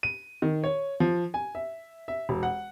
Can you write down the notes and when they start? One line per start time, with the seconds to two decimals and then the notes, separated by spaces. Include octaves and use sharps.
0.03 D#7
0.42 D#3
0.64 C#5
1.00 F3
1.34 G#5
1.55 E5
2.08 E5
2.29 E1
2.43 F#5